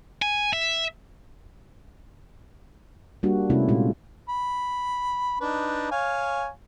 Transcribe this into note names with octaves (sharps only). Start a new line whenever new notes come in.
G#5
E5
G3 A#3 D4 F#4
C3 A3 B3 C#4 E4
A#2 G#3 F4
B5
D4 D#4 B4
C#5 F5 G#5